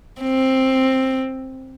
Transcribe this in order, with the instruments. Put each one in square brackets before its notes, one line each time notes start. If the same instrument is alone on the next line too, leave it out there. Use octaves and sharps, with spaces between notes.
[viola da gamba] C4